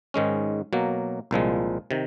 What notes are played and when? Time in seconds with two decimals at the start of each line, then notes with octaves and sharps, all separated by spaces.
0.14 G#2 D#3 G#3 C#4
0.73 B2 F#3 A#3
1.31 C2 A#2 F3 G#3
1.91 C3 D#3